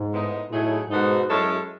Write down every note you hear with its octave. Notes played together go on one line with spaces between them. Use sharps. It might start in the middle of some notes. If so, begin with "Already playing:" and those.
Already playing: G#2
A2 G#3 B3 D#4
A2 F#3 A3 D#4 G#4
G#2 B2 G#3 D#4 F#4 A4
F#2 G#3 C#4 E4 A4